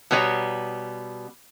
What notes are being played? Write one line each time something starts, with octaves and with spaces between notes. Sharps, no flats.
B2 G3 B3 C#5 D5 A#5